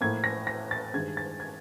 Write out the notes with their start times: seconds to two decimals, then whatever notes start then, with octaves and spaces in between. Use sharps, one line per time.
0.01 A2 F3 A#3 G#6
0.24 A#6
0.47 A#6
0.71 A6
0.93 G2 D#3 G#3 G#6
1.17 A6
1.40 G#6